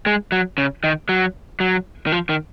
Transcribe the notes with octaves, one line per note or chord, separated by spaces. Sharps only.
G#3
F#3
C#3
D#3
F#3
F#3
D#3
F3
D#3